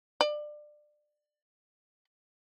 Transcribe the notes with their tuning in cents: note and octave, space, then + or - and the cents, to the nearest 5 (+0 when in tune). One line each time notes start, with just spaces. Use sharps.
D5 +25